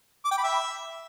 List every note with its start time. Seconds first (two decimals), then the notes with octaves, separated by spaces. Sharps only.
0.25 D6
0.31 G5
0.38 B5
0.44 E5